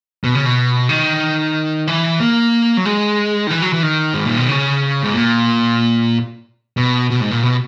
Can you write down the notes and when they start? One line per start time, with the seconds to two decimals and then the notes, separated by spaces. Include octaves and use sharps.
0.24 B2
0.35 C#3
0.45 B2
0.89 D#3
1.87 E3
2.20 A#3
2.77 F#3
2.85 G#3
3.47 D#3
3.50 E3
3.62 F#3
3.73 E3
3.83 D#3
4.14 G#2
4.25 A#2
4.37 B2
4.49 C#3
5.03 G#2
5.14 A#2
6.77 B2
7.10 B2
7.21 G#2
7.31 A#2
7.43 B2